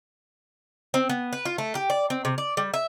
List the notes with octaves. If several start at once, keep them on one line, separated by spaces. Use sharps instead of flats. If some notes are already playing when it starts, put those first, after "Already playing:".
C4
B3
B4
F4
A3
G4
D5
C4
C3
D5
G3
E5